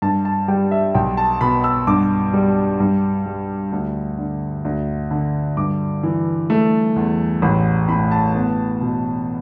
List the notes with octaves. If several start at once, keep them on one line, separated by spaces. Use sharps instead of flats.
G2 A5
A5
G3 G5
E5
B1 G5
A5
B2 B5
E6
G2 D6
G3
G2
G3
D2
D3
D2
D3
G2 D6
E3
A3
E2
A1 B5
A2 B5
A5
B3
B2